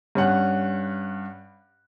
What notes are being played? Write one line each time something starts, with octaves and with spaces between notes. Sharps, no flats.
G2 C#4 F#5 F#6